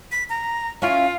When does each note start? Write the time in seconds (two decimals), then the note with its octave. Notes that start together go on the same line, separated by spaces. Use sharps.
0.12 B6
0.30 A#5
0.82 C#4 E4 F4 F5